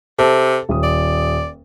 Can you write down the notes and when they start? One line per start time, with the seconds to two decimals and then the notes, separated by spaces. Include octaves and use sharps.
0.19 C3 A4
0.69 D#1 D#6
0.83 D5